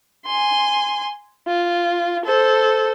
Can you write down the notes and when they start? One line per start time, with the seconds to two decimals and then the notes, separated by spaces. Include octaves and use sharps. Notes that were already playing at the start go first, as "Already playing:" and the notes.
0.26 G#5 C6
1.47 F4
2.25 A4 C5